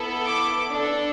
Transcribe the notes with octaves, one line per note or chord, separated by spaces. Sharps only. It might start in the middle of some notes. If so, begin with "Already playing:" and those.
Already playing: B3 E4 A4
D6
D4 A4